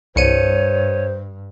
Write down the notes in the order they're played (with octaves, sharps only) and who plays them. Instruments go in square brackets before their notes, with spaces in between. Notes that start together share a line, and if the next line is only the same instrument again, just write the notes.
[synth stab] C2 C#7 D#7 [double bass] G2 [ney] C5 [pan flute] C#5